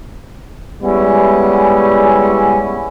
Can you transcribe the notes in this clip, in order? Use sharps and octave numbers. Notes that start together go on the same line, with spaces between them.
G3 G#3 B3 C#4 E4